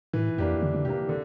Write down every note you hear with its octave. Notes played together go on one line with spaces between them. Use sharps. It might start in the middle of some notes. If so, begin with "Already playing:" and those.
A2 E3
F2 A#3 D4 G4
D3 E3
D3
C3 A#3 D4 G4
D3